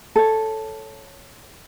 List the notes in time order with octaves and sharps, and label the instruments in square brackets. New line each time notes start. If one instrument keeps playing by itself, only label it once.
[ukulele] A4 C#5